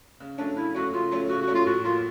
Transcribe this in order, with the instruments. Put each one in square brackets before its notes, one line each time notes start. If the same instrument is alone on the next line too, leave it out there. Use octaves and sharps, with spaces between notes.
[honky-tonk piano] C#3
[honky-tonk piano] F#3 A3 C#4 [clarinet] D4
[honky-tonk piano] C#3 [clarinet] E4
[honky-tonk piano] F#3 A3 C#4 [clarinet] F#4
[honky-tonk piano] C#3 [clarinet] F4
[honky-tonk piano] F#3 A3 C#4
[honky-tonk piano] C#3 [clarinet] F#4
[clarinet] F#4
[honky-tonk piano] F#3 A3 C#4
[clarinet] F4
[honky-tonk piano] A2 [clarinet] F#4
[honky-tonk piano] F#3 A#3 [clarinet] F4